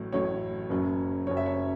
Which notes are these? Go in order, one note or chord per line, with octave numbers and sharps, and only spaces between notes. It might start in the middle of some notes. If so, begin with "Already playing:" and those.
Already playing: A1 A2 F#3
A1 A2 F#3 C#5
F#1 F#2 F#3
F#1 F#2 F#3 C#5
E5
C#5